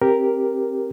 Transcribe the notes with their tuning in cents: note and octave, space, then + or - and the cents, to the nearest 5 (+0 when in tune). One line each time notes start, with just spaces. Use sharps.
C4 +20 G4 +0 A#4 +0